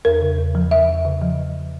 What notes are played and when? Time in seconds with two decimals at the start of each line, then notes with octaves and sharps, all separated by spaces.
0.05 E2 A#4
0.21 C#3
0.39 E2
0.55 F3
0.71 E2 E5
0.89 C#3
1.05 C#3
1.22 F3
1.39 F3